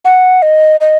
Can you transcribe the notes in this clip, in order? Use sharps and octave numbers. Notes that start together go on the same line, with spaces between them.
F#5
D#5
D#5